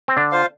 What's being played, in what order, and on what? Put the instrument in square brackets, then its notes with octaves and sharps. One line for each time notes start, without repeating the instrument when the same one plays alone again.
[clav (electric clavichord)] C4
D3 D4
[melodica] F4 C5 F5